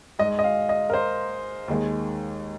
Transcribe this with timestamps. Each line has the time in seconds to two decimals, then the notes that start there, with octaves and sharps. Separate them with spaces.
0.19 G#2 D#5
0.23 G#3
0.39 D#5
0.44 F5
0.69 D#5
0.90 A#4
0.94 C5
1.68 D#2 D#3 G#3